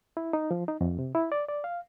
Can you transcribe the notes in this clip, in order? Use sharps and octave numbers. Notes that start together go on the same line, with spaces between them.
E4
D#4
F3
D#4
F2
C3
E4
D5
D5
F5